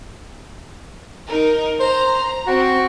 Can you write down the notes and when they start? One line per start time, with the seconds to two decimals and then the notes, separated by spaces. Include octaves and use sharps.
1.27 D#4 A#4
1.80 C5 A#5
2.47 C4 F#4